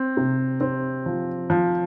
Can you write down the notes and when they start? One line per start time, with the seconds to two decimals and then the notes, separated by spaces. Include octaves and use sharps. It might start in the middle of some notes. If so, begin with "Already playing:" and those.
Already playing: C4
0.17 C3
0.61 C4
1.06 F3
1.50 F3